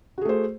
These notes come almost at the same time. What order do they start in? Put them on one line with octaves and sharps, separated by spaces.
F#4 G#4 A3 C5